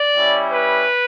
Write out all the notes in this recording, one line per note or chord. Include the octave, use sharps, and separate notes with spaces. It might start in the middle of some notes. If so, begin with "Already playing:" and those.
Already playing: D5
G3 C#4 E4
B4